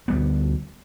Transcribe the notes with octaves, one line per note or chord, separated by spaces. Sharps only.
D2 G3 B3